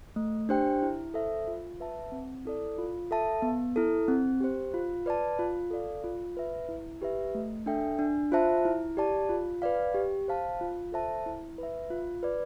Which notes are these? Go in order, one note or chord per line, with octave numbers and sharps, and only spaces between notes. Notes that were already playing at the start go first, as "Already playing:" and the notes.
A3
D4 G4 C5 G5
E4
A4 C5 E5
F4
B4 E5 A5
C4
E4 A4 D5
F4
A4 E5 A5
B3
E4 A4
C4
G4 C5
F4
B4 D5 A5
F4
A4 D5 F5
F4
B4 E5
E4
G4 B4 E5
A3
D4 A4 E5 G5
D4
F4 C5 E5 A5
E4
G4 D5 A5
F4
B4 D5 F5
G4
C5 F5 A5
F4
A4 C5 E5 A5
E4
B4 E5
F4
B4 D5